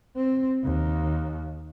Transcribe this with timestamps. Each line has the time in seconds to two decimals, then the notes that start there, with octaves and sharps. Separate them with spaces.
0.17 C4
0.63 D#2